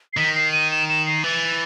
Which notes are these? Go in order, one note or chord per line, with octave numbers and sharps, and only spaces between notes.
C7
D#3 B6
C7
D#7
E7
E7
C7
E3 A6